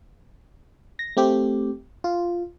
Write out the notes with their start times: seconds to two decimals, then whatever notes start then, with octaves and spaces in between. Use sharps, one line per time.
0.99 A#6
1.17 A3 C4 G4
2.04 F4